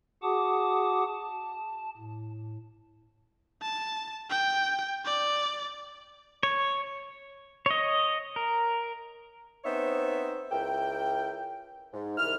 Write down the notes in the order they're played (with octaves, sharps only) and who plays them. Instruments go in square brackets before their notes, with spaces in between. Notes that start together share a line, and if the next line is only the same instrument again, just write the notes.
[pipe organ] F#4 G#4 F#5 A5 D6 D#6
A5
A2
[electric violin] A5
G5
D5
[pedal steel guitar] C#5
C#5 D#5
A#4
[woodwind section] B3 C4 D#4 C5 C#5 E5
C#2 E4 A#4 G5
G#2
C2 D#3 E4 F6